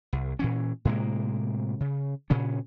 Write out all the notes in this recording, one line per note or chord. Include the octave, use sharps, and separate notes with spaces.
C2
A#2 E3 C#4
A2 C3 G#3 A#3
C#3
A#2 C#3 C#4